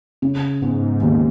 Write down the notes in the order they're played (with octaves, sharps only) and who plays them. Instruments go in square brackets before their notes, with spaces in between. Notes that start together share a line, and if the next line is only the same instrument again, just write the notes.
[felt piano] C#3
[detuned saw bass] G#2 [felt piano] B3
[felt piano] D#2